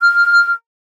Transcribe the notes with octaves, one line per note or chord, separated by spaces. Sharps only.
F6